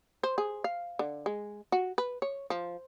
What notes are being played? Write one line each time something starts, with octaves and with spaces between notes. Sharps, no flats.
C5
G#4
F5
D3
G#3
F#4
B4
C#5
F3